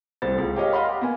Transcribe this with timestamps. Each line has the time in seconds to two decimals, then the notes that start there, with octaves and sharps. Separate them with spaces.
0.22 C2 A3 C5 A6
0.38 C#2
0.56 G4 A#4 C#5 D#5 F5
0.73 D#5 F5 F#5 B5 C6 F6
0.89 G4
1.01 A#3 B3 G#5